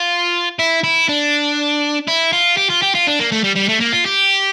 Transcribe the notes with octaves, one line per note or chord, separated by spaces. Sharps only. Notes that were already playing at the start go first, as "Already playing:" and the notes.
Already playing: F4
E4
E4
D4
E4
F4
G4
F4
G4
F4
D4
A#3
A3
G3
G3
A3
A#3
F4
G4